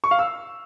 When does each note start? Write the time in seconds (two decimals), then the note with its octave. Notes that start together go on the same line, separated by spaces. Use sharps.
0.04 C#6
0.11 F5
0.19 E6